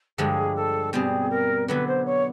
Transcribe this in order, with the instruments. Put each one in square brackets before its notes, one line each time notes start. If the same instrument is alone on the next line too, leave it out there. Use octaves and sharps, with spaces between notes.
[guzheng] G2 D3 F3 G#3 [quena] G#4
[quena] A4
[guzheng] B2 G3 C4 [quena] G#4
[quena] A#4
[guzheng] D3 F#3 B3 [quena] B4
[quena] C5
C#5